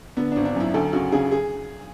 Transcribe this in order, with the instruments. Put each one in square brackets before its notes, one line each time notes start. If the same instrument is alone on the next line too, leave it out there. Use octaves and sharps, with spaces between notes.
[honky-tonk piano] D3 B3
D4
G#1
D4
F#2 E4
D2 A4
C#3 F#4
C#3 G#4
G#4